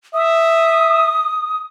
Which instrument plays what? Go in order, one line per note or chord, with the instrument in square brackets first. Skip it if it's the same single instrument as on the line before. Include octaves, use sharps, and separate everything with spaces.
[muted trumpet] E5 [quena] D#6